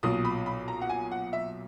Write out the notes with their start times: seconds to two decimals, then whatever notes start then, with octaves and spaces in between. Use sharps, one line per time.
0.03 B1 A#2 D#6
0.25 B5
0.46 B5
0.68 A#5
0.82 F#5
0.89 G#5
1.11 F#5
1.33 E5